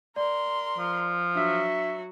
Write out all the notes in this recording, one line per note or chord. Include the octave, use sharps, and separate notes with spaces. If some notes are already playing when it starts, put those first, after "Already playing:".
A#4 D5 C6
F3
F#3 D4 F#4 E5 E6